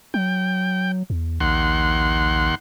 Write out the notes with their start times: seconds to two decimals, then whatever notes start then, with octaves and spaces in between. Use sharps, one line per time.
0.14 F#3 G5
1.10 E2
1.40 A#1 D#2 F#5 C6